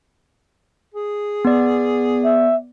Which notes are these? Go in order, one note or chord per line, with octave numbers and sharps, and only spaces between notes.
G#4
B3 D5
E5